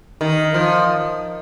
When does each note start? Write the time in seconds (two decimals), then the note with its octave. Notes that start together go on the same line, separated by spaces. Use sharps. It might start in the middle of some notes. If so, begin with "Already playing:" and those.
0.21 D#3
0.54 F3